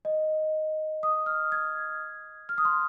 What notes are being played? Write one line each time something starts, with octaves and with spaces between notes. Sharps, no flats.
D#5
D#6
F6
G#6
F6
D#6
C6